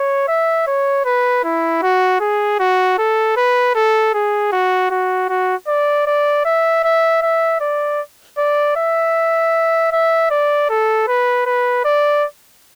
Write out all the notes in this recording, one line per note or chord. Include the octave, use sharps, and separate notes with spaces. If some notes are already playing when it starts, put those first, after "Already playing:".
Already playing: C#5
E5
C#5
B4
E4
F#4
G#4
F#4
A4
B4
A4
G#4
F#4
F#4
F#4
D5
D5
E5
E5
E5
D5
D5
E5
E5
D5
A4
B4
B4
D5